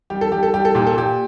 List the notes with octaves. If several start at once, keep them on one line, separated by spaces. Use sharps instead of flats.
G3 G4
A4
G3 G4
A4
G3 G4
A4
A#2 G4
A4
A#2 G4